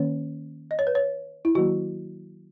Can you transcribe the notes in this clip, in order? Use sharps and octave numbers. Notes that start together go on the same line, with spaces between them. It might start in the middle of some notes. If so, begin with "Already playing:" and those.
Already playing: D#3 A#3 C#4 C#5
D#5
C#5
B4
C#5
E4
D#3 F#3 A#3 F#4